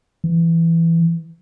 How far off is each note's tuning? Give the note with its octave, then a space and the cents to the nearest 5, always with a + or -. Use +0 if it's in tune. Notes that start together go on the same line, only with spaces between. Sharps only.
E3 +10